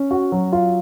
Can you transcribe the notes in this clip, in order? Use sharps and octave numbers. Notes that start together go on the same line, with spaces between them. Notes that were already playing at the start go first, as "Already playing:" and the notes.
Already playing: C#4
F#4
F#3
F4